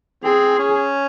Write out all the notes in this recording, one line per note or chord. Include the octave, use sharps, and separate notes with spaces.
C4 G#4
C#4